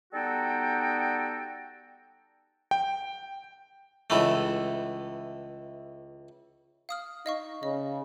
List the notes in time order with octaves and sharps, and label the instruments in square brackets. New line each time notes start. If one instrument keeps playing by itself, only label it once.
[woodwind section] G3 B3 D#4 F#4 A4 G5
[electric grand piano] G5
[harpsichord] C#2 E3 A3
[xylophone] F5 D#6 F6
[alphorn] D#4 [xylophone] D#5 F5 C#6
[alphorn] C#3 [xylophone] D#5